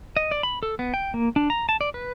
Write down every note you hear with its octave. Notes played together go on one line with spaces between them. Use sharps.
D#5
D5
B5
A4
B3
G5
A#3
D4
A#5
A5
D5
B4